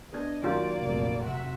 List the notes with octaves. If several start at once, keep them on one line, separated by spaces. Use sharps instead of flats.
B3 D4 D#5 G#6
F#2 D#3 F#3 A#3 C#4 F4 G4 D5
F1 A#1
C3 F#4 E5